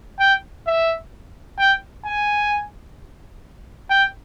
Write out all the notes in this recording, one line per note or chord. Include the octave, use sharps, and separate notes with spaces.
G5
E5
G5
G#5
G5